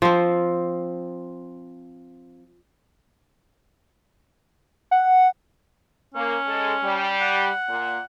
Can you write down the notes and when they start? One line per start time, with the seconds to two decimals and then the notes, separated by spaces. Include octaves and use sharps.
0.02 F3 C4
4.91 F#5
6.15 A#3 C#4
6.47 G#3 A4
6.83 G3
7.21 F#5
7.69 A#2